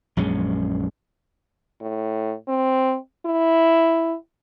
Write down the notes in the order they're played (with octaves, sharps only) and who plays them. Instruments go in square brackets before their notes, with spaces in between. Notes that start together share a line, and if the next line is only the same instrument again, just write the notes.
[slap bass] A#1 F#2 G#3 C#4
[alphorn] A2
C4
E4